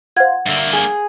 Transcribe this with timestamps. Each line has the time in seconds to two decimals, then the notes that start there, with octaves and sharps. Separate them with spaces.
0.16 F4 C5 F#5 G#6
0.46 G2 D3 A#3 E5 B6
0.73 G#4